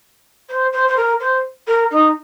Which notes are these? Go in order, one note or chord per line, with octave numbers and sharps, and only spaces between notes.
C5
C5
C5
A#4
C5
A#4
D#4